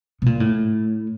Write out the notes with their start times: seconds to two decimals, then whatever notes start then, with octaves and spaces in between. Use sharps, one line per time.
0.22 B2
0.26 A#2
0.40 A2